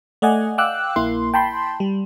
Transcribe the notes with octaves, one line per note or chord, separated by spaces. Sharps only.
A3 D5 D#5 F#5 G#5
F5 G5 D6 E6 F#6
A#1 A#3 E4 C6
G5 A5 B5 C6
G3